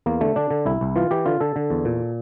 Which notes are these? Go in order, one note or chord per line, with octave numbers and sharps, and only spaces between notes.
E2 A#3
D3 A3
D3 D4
D3
C2 E4
C2
E3 F4
E3 G4
D3 F4
D3 A4
D3
E2
A#2